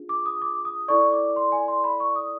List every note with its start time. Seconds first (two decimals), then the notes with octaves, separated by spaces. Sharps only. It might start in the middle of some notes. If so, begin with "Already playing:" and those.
Already playing: D4 F4 G#4
0.09 D6
0.26 D#6
0.42 D6
0.65 D#6
0.88 E4 A4 D5 C#6
1.13 D6
1.36 C6
1.52 G#5
1.68 C6
1.84 B5
2.00 C#6
2.16 D#6